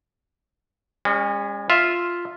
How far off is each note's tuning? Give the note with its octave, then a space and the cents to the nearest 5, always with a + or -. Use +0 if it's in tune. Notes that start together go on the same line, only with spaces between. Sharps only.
G#3 -45 C#4 +0
F4 +0 E5 +0